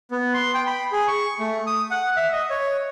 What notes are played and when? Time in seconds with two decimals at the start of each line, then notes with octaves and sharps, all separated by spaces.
0.11 B3
0.34 C6
0.54 G5
0.67 B5
0.92 G#4
1.08 C#6
1.39 A3
1.67 D#6
1.91 F#5
2.16 E5
2.33 D#5
2.50 C#5